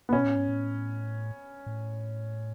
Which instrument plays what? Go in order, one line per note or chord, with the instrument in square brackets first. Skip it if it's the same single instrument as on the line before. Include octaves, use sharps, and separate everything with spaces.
[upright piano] B3
[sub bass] B2 [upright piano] C#4
[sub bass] A2
G#2
A2
A2